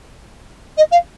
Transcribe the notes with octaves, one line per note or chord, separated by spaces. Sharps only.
D#5
F5